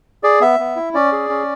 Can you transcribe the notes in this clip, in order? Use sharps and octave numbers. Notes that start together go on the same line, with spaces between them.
G#4 D5
B3 E5
B3
E4
C#4 D5
G#4
C#4